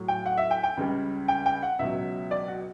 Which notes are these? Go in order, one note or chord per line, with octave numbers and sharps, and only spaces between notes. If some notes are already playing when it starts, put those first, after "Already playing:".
Already playing: A2 F#3
G5
F#5
E5
G5
G5
C#2 C#3 G3
G5
G5
F#5
C#2 B2 F#3 E5
D5
F#4